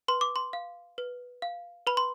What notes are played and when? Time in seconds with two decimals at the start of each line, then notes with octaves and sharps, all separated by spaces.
0.08 B4 C6
0.21 D6
0.36 C6
0.53 F5
0.98 B4
1.42 F5
1.87 B4 B5
1.97 C6